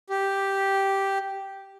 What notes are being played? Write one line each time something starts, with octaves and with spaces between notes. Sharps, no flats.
G4